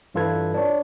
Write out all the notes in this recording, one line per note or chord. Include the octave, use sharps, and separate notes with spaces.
G2 E3 F4 A4 B4 G#6
D4 C#5